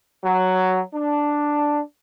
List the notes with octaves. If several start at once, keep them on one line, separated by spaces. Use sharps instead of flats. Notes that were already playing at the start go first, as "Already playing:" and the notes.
F#3
D4